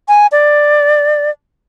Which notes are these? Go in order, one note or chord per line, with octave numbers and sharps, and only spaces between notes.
G#5
D5